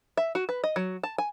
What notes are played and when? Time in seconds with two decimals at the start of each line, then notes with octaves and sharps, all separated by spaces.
0.17 E5
0.35 F#4
0.49 B4
0.64 D#5
0.76 F#3
1.03 A5
1.18 G#5